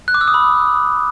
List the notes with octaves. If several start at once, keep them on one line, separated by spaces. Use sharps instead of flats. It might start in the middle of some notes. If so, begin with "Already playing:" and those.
F#6
D6
E6
D#6
B5